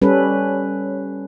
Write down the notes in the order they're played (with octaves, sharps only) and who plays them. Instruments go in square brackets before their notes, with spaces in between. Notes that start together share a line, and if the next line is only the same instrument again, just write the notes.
[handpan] G3 C#4 A4 B4